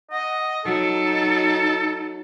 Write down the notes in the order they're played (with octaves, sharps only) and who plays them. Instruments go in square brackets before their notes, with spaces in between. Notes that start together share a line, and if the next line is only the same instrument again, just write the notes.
[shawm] D#5 [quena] F#5
[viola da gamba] F#3 [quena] D#4 [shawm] A4